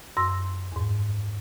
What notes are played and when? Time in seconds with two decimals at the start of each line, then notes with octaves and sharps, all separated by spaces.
0.17 F#2 C6 E6 A#6
0.72 E2 G#2